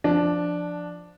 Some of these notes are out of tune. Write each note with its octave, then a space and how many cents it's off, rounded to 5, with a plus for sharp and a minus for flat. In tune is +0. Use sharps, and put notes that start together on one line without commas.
F3 +0 D4 +0